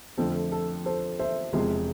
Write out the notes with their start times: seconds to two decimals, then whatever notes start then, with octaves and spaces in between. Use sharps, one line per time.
0.18 F2 D3 F3 A3 C4 A4
0.52 A4
0.85 A4 C5
1.19 C5 E5
1.53 E1 E2 C3 F3 G#3